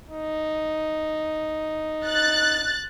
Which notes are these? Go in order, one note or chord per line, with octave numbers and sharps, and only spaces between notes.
D#4
F#6 A6